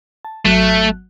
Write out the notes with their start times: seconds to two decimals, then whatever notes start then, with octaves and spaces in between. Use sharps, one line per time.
0.25 A5
0.45 G#1 F#3 A3 F#6